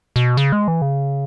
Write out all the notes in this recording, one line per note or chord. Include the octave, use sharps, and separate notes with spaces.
B2
C#3
G#3
E3
C#3